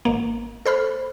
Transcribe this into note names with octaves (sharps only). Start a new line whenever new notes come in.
G#1 A#3
A4 C5 B5 F6